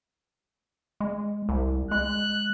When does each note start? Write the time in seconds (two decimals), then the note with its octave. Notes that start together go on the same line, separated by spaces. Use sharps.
1.00 G#3
1.49 C2
1.91 G#3 F#6